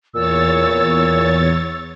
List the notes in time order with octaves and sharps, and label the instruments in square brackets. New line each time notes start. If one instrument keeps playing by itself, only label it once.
[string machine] E2 C#5 A6 [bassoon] A#2 [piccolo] E6